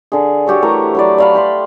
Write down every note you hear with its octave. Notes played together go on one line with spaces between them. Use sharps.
D3 G#4
F#4 G4 A4 C#5
E3 A3 A#4 A#5
F#3 B4 D5
D5 F5 B5
G5 B5 C6